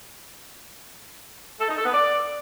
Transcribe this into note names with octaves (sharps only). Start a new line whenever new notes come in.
A4
D#4
A4
B3
D5